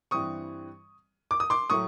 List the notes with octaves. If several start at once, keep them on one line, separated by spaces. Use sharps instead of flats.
G2 E3 G3 C4 C#6 D#6
D6
D#6
C6 D6
A2 F#3 A3 C#6 D#6